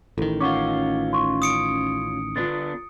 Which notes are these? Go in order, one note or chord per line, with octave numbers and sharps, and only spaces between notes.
A1 D#3 E4 A4
C#4 F4 F#5 C#6 D6
C6 C#6
D#6 C#7 D7
D3 B3 D4 F4 A6